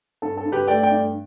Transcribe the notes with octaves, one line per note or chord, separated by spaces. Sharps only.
G2 A4
A4
G2
G4 B4
A3 D5 G5
D5 G5
G2